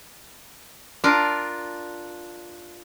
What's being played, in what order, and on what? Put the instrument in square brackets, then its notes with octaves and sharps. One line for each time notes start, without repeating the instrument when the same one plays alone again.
[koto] D4 F4 A#4